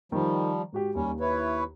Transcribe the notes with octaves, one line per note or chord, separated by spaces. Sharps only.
D#3 F3 G3
G#2 F#4 G4
D#2 G3 C#4
E4 B4 C#5